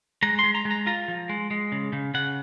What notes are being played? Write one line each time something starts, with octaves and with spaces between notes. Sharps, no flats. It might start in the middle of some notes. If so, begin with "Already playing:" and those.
G#3 A#5
G#3 C6
A#5
G#3
A#5
F4 A#5
F3
G#3
G#3
C#3
C#3
C#3 F#5